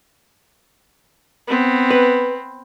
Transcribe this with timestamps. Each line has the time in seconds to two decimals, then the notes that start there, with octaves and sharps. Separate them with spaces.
1.47 B3 C4
1.91 B4